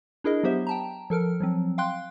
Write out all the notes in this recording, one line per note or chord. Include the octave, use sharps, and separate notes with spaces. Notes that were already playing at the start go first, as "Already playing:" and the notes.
D4 E4 G#4 A#4 D#5
F#3 B3 G4 C5 E5
G5 A5 A#5
F3 A4 A#4 F6
F3 F#3 C4
F5 G5 C6 F#6